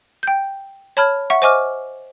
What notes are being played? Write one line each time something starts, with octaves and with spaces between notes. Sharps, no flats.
G5 G6
C#5 A5 B5 F6 G#6
E5 F#5 C#6
C5 D#5 G#5 C#6 D6 F6